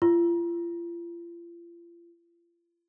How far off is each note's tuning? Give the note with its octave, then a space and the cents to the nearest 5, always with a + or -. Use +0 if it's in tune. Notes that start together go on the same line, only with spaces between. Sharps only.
F4 -35